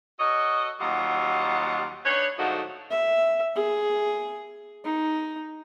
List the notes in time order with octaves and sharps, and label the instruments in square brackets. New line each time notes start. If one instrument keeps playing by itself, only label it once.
[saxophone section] F#4 A4 C#5 D#5
D#2 F#3 G3 F4 D#5 F#5
D4 D#4 B4 C#5
G#2 D3 F3 A3 D#4 F#4
[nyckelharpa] E5
G#4
D#4